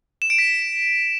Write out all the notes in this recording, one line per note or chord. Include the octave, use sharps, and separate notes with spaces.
E7
D7
B6